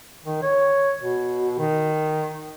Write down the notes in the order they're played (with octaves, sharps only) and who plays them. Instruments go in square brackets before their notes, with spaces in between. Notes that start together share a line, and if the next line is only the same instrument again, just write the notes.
[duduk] D#3
C#5
B2
D#3